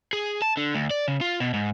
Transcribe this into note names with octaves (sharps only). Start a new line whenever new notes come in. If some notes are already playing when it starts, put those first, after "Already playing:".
G#4
A5
D3
D2
D5
C#3
F4
B2
G#2